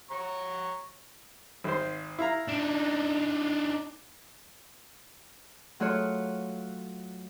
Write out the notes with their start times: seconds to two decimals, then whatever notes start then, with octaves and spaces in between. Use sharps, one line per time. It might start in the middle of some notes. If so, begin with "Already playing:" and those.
0.11 C#5 A#5 C#6
1.64 G#1 C5
2.19 E4 F5 A#5
2.49 D4 D#4
5.80 F#3 A3 F4 F#4 C#5